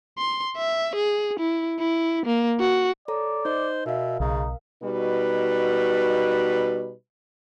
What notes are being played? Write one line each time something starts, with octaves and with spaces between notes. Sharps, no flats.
C6
E5
G#4
E4
E4
A#3
F#4
A4 C#5 D5 A#5
D#4 C5 D#5
B2 A#4 E5 F5
B1 C#3 D#4
B2 G3 D#4 F#4 B4